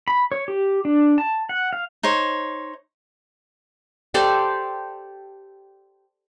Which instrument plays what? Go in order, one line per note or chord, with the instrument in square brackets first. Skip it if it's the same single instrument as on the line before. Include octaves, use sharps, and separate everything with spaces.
[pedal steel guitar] B5
C#5
G4
D4
A5
F#5
F5
[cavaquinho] D#4 C5 C#5
[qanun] G4 A4 C5 D5